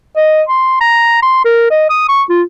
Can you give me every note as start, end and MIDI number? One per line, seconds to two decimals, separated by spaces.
0.16 0.42 75
0.49 0.77 84
0.81 1.18 82
1.22 1.43 84
1.45 1.66 70
1.71 1.90 75
1.90 2.03 87
2.09 2.23 85
2.29 2.42 65